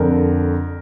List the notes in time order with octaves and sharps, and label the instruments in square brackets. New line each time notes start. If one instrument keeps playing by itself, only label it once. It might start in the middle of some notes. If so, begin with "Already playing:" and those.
Already playing: [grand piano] F2 D3 A#4